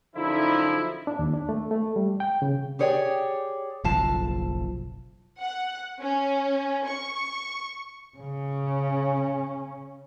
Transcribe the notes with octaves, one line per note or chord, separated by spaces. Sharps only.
F#2 D3 F3 D#4 E4
D4
D#2
D4
A3
A3
G3
G5
C#3
G4 G#4 C#5 D5 G5
F#1 B1 C3 F3 F5 A5
F#5
C#4
C#6
C#3 C#4